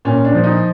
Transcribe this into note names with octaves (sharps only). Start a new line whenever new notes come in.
A#2 C#4
D4
F3
D#4